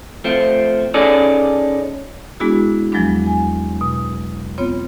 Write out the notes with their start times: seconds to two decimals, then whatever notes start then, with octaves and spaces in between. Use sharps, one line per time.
0.24 F3 A3 C4
0.94 C#4 D#4 G#4 A4 D5
2.40 G#3 B3 D4 E4 F#4 G#4
2.92 E2 F3 F#3 G#3 B3 D4
3.26 G#5
3.81 B2
4.58 B3 C4 F4 C#5